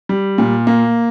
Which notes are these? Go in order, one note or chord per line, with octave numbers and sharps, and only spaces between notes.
G3
A#2
A#3